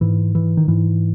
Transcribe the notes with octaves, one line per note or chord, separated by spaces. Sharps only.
G#2 E3
E3
D#3
G#2 E3